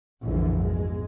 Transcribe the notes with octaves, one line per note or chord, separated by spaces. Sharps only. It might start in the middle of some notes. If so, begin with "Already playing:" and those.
F1 A#1 G#2 D3 E3
G#2 B2 G#3